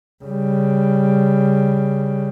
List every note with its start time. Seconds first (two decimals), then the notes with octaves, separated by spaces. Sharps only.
0.24 C#3 G3